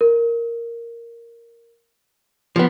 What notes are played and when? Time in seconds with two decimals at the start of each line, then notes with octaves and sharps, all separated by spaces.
0.01 A#4
2.56 F3 B3